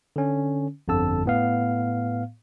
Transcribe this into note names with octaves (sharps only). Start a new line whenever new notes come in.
D3 C#4
G1 F2 D3 A5 E6
A2 B3 F5